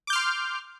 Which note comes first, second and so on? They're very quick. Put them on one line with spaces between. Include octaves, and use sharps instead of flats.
D6 G6 F6 C6